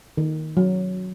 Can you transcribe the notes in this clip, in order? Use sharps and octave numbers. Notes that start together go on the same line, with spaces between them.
D#3
F#3